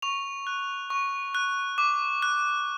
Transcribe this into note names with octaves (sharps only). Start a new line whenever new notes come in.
C#6 F7
F#6
C#6
F#6
D6
F#6